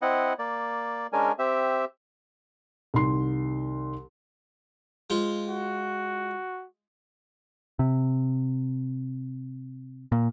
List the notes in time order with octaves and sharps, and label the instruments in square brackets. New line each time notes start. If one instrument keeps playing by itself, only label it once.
[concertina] C4 E4 D#5 F#5
A#3 D5
G#3 C#4 D4 A#4 G#5
C4 G4 E5
[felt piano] C2 D#3 C6
[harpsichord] G#3 F4 C5
[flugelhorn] F#4
[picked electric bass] C3
A#2